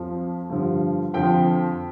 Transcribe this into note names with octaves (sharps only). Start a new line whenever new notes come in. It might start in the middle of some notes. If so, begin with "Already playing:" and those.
Already playing: F2 F3
G2 D3 F3
F2 D3 F3 G5